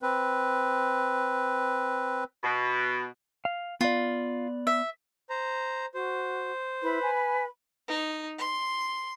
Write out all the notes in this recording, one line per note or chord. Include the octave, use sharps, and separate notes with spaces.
C4 B4
B2
F5
B3 F4 D5
E5
C5 A#5
F#4 C5
E4 B4 B5
G#5
D#4
C6